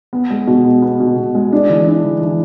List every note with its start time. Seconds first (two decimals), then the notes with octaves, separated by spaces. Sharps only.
0.13 B3
0.30 G#3
0.47 B2
0.65 B3
0.82 B3
1.00 B2
1.16 B2
1.35 G#3
1.53 D4
1.70 E3
1.87 D4
2.04 E3
2.22 E3